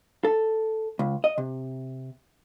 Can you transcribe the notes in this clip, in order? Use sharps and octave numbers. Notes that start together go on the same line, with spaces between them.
A4
C#2
D#5
C3